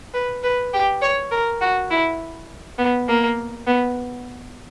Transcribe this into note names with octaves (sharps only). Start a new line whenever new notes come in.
B4
B4
G4
C#5
A#4
F#4
E4
B3
A#3
B3